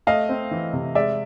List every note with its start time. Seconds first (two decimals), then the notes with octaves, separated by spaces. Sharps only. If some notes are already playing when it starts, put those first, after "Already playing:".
0.07 A3 D#5 F5
0.29 C4
0.51 E3
0.73 C3
0.95 G#3 D5 E5